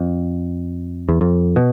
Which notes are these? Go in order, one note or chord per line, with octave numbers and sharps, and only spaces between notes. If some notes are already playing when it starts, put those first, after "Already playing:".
Already playing: F2
E2
F2
B2